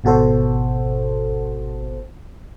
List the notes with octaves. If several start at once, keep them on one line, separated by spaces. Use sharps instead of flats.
G#1 B2 F#4 A4 C5